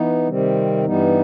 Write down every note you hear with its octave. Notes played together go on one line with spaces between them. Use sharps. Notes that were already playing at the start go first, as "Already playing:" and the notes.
Already playing: E3 B3 D#4
C3 D#3 G3 C4
G2 E3 G3 B3 D#4